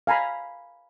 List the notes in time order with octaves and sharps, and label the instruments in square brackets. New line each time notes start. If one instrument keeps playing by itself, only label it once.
[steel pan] F5 G#5 A#5 B5